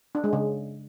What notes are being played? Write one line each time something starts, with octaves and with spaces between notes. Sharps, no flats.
D4
G#3
C#3